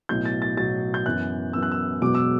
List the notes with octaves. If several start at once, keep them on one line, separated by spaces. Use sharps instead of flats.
B1 A2 F#3 G6
A6
A6
B1 A2 F#3 A6
G6
F#2 E3 B3 E4 F#6
F#2 E3 B3 E4 E6
F#6
E6
E1 E2 B2 F#3 D6
E6